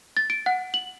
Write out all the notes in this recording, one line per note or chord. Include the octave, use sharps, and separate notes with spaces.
A6
D7
F#5
F#7